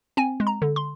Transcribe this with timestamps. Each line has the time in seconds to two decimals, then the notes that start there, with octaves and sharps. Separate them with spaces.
0.17 C4 G#5
0.40 G#3
0.47 A#5
0.62 D3
0.76 C6